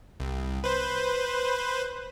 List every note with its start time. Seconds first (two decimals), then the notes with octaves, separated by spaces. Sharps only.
0.20 C2
0.64 B4 C5